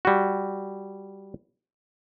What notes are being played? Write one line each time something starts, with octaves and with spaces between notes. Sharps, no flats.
G3 F#4